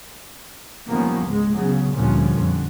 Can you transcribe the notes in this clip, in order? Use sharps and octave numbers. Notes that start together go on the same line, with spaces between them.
D#3 F3 G3 A#3 B3 C#4
C#2 G#2 G#3
C#3 F#3 B3
D2 A#2 D3 F3 G3 C#4
F2 D3